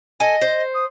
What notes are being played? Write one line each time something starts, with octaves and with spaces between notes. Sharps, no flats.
A4 D#5 G#5
C5
D#6